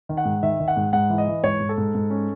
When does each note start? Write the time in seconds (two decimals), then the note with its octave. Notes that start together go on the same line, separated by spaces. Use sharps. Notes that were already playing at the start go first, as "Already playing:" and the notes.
0.09 D#3
0.17 F#5
0.25 G#2
0.43 D#3 E5
0.60 D#3
0.68 F#5
0.77 G#2
0.93 G#2 F#5
1.10 E3
1.18 D#5
1.27 E3
1.43 G#2 C#5
1.60 G#2
1.69 A4
1.78 G#2
1.95 G#2
2.10 C#4